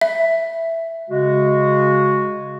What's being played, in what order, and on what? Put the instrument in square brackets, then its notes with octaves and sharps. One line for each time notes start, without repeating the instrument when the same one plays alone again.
[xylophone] E5
[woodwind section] C#3 G#3 F#4